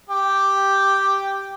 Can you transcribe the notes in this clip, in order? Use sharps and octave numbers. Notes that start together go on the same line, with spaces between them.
G4